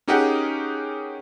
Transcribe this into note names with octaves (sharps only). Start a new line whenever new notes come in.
C#4 D#4 G4 G#4 A#4 F#5